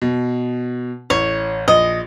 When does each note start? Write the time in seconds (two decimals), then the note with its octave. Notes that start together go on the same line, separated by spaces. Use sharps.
0.02 B2
1.10 A1 C#5
1.68 A#1 D#5